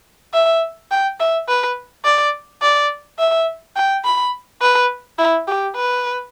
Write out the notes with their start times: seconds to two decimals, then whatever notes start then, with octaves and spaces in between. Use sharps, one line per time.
0.34 E5
0.91 G5
1.20 E5
1.49 B4
2.05 D5
2.62 D5
3.19 E5
3.76 G5
4.05 B5
4.62 B4
5.19 E4
5.48 G4
5.76 B4